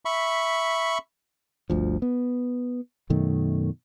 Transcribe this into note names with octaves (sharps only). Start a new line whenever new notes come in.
E5 B5 C#6
G1 D2 F3
B3
F#2 B2 D#3 A3